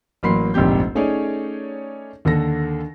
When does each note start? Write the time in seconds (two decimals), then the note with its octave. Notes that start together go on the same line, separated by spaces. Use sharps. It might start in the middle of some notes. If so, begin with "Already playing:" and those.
0.23 A1 F#3 A#3 B5 C6 C7
0.54 F1 A#1 G#2 C4 G4 G6
0.95 A3 C#4 D#4 G#4 C#5 D5
2.25 D#2 D3 A4 A#6